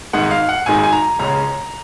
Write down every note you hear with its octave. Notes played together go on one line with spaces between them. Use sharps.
G#1 G#2 D#3 G#3 F#5
F5
F#5
G#1 G#2 D#3 G#3 G#5
G#5
A#5
C#2 C#3 G#3 C#4 A#5